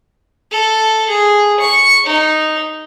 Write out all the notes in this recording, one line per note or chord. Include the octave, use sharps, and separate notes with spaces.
A4
G#4
C#6
D#4